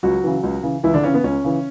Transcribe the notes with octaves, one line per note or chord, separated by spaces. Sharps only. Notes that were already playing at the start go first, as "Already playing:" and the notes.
C#2 F#3 F#4
C#3 E3
C#2
C#3 E3
C#2 E3 E4
D3 D4
C#3 E3 C#4
B3
C#2 C#4
C#3 E3